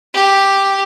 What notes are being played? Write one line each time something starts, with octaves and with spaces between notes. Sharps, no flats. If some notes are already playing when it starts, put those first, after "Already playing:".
G4